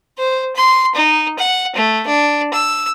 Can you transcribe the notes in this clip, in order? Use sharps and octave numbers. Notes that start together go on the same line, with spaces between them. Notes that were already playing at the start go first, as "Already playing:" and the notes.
C5
C6
D#4
F#5
A3
D4
E6